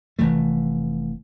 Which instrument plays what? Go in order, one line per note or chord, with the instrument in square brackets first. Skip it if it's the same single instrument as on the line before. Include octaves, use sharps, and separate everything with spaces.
[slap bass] F1 E3 A3